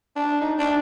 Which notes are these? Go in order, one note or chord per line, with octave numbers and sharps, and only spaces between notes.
D4
D#4
D4